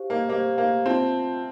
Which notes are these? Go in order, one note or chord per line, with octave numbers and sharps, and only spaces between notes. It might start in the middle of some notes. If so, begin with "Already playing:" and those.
Already playing: G4 C5 F5
A#3
A#3 G4 C5 F5
A#3
C4 F4 C5 E5 A5